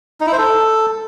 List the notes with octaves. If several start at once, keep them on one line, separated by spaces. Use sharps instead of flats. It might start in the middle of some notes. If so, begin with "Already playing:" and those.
D#4
E4
C5
A4